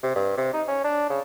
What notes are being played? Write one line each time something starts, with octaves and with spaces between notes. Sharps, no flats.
C3
G2
C3
D#4
C#4
D4
C#3